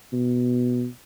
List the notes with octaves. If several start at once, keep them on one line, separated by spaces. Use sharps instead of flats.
B2